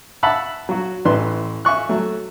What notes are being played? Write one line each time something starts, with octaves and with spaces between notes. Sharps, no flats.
E5 F#5 A5 B5 E6 F#6
F#3 F#4
A1 E3 B4 C6
E5 G#5 C#6 F#6
F#3 A3